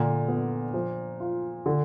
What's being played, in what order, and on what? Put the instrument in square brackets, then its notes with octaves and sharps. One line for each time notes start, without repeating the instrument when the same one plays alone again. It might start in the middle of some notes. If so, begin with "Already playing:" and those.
Already playing: [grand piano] A#2 [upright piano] D3
[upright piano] B3
F3
F4
D3